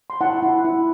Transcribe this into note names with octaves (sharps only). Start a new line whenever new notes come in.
C6
E4 F#5 A5
E4
E4